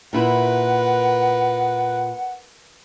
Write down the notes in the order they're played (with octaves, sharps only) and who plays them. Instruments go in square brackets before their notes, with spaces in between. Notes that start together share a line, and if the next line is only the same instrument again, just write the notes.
[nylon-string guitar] A#2 E4 [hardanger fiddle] A#4 B4 [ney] F#5